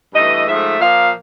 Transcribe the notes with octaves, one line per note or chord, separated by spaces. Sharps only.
G2 E3 A3 D#5
G#2 F3 A3 E5
A#2 F3 A#3 F5